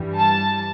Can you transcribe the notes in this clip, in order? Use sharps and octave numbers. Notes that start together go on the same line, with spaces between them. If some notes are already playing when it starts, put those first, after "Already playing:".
Already playing: G2 E3 G3
A5